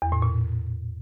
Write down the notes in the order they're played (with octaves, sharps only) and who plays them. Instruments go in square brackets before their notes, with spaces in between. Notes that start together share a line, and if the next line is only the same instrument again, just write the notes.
[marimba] E2
A2
A#2